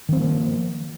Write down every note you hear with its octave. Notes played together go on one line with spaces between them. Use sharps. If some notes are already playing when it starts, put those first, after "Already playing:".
D#3 F3 A#3 C4